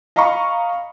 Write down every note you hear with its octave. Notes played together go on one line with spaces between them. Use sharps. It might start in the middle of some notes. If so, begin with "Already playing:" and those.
D#5 F5 A#5 B5 C#6